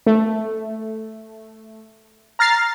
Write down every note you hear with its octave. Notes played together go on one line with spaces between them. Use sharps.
A3
A#5 F6 A6 C7